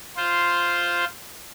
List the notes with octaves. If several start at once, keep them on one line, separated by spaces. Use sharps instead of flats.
F4 C5